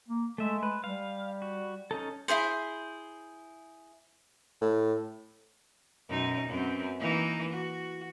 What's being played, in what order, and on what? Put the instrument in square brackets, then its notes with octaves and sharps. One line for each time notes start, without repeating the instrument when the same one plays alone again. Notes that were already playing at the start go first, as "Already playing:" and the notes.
[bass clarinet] A#3
[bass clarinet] G#3 [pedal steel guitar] A3 E5
[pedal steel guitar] B4
[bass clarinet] G3 [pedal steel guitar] F5
[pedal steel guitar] F#4
C#4 D#4 A4
[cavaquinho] E4 F4 G#4 C5
[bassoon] A2
[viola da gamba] F#2 B2 D#4
F#2 B3 C4
E3 A#3 D#4
F#4